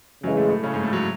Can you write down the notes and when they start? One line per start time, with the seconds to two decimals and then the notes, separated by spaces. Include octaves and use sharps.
0.24 F#2 C#3 E3 F#3 G#3
0.37 A2 A3
0.50 A2 A3
0.64 C#3 C#4
0.73 G#2 G#3
0.83 A2 A3
0.93 F#3